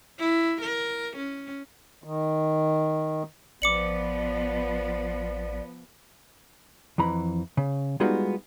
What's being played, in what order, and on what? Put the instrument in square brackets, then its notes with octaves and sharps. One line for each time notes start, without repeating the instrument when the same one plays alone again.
[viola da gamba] E4
A#4
C#4
[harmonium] D#3
[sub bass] A1 [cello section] F3 B3 [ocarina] D5 [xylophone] D6 C#7 F#7
[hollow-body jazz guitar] F2 E3 A#5 B5
C#3
G3 G#3 B3 D#4 F4 F#4